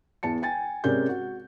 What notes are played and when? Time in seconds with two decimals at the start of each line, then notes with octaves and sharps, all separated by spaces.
0.23 E2 A5 C#7
0.42 G5 G#5 A6
0.84 C3 G#3 C#4 A#4 D5 G6
1.09 F#4